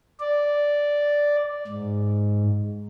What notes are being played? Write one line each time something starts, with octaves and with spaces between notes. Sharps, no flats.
D5
G#2